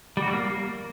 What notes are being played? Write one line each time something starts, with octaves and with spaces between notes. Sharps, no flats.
G3
F#4
G3
A#3